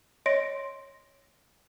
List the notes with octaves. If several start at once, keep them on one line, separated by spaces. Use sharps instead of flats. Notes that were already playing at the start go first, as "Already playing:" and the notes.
C#5 D#5 C6 A#6 D7